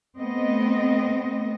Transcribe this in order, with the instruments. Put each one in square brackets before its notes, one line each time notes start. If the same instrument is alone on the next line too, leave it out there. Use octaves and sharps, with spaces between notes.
[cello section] A3 B3 C4 D#5